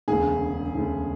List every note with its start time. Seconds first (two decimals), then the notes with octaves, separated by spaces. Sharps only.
0.08 E1 D2 C#3 G#4
0.75 E1 D2 C#3